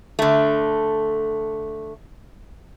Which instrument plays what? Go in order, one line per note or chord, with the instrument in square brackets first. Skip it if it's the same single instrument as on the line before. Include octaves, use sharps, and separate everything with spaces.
[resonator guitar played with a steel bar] D3 A3